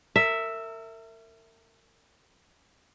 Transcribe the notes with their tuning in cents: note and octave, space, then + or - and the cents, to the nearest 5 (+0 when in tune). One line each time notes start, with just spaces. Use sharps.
A#4 -40 E5 +0